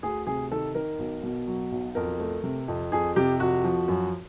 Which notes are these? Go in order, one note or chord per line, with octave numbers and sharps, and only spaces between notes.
D2 G#4
C3 G#4
D#3 A4
D#3 A#4
B1
B2
F#3
B1
F2 A#4
A3
C3
F2
F2 G#4
C3 G4
F2 F#4
F3
F#2